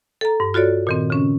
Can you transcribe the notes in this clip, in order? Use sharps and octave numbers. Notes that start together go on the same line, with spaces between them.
A4 A#5
G2
F4 F#4 A4 C#5 D5
A#2 D#3 C4
C#3 C#4